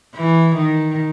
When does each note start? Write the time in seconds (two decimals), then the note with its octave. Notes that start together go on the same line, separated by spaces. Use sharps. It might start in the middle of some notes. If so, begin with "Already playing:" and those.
0.16 E3
0.56 D#3